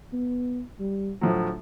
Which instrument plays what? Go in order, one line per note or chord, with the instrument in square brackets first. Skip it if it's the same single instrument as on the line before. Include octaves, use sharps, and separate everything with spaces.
[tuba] B3
G3
[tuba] D2 [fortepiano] A2 F3 F#3